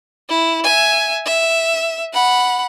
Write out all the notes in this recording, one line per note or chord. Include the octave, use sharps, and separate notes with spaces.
E4
E5 G#5
E5
F#5 B5